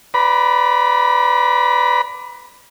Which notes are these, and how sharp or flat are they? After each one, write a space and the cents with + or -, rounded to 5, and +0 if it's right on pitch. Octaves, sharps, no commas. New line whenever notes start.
B4 +25 D5 +0 B5 -45